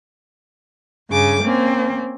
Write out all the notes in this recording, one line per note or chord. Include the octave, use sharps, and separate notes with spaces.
G2 C#3 G#5 D6
A#3 C4 C#4